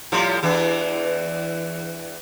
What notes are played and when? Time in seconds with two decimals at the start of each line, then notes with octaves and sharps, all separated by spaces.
0.12 A2 F3 G3
0.43 E2 E3 D4